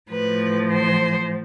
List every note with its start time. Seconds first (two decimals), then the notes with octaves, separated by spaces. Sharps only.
0.12 A2 F3 B4
0.73 C5